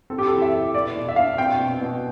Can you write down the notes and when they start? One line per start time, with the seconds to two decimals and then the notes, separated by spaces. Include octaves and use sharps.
0.10 C4 A4
0.18 G4
0.27 E3 A4
0.42 E5
0.52 E3
0.74 B3 D5
0.95 B2
1.09 E5
1.16 D4 F5
1.38 C4 G5
1.59 B2
1.81 B2